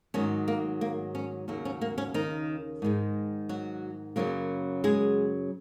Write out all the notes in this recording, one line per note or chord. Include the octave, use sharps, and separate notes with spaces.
G#2 D#3 F#3 C#4
A#3
A#3
C#4
D#2 C#3 F#3 A#3
C#4
A#3
C#4
D#3 D#4
G#2 D#3 G#3
F#3 F#4
F#2 C#3 F#3 A#3
G#3 G#4